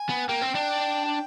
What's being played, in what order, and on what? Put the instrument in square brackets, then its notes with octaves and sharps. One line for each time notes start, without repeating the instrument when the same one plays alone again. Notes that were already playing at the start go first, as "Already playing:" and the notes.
Already playing: [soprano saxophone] G#5
[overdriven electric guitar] B3
[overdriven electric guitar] A#3 [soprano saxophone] G5
[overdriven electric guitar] C4
D4
[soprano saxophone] G5